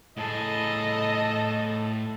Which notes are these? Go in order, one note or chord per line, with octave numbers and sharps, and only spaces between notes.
A2 G#4 A4 D#5